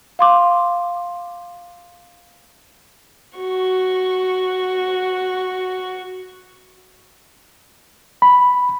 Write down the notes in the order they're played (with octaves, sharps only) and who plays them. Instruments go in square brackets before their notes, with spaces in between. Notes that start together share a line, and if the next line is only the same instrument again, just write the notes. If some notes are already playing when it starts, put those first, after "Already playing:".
[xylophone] F5 C6 D6
[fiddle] F#4 C#6
[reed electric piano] B5